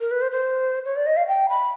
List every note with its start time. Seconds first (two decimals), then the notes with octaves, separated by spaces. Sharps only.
0.01 A#4
0.11 B4
0.22 C5
0.32 C5
0.85 C#5
0.96 D5
1.06 D#5
1.17 F5
1.28 G5
1.49 B5